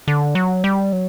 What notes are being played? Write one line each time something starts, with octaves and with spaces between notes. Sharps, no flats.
D3
F#3
G3
F#3